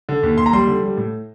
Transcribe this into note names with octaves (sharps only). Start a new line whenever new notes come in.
D3
D#2
D#2 C6
A#5
G3 C6
D3
G3
A2